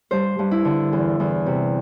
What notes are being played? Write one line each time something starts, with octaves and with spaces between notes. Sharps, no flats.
G2 C5
G2
E4
D3
E2
E2
C3